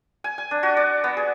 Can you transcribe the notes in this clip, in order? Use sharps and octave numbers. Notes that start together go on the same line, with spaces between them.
G#5
G#5
D4
F#4
D5
B3
G#4